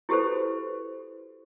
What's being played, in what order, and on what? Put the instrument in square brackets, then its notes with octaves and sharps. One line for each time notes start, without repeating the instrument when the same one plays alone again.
[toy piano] E4 F#4 G4 A4 B4 C5